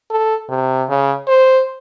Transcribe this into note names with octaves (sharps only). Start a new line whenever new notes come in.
A4
C3
C#3
C5